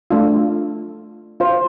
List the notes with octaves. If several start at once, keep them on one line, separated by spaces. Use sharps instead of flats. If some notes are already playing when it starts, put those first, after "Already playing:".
A3 D4 F4
F4 C5 F5